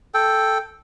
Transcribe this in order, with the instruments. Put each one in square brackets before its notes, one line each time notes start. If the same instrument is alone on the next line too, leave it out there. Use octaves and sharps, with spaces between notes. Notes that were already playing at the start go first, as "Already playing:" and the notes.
[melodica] A4 G5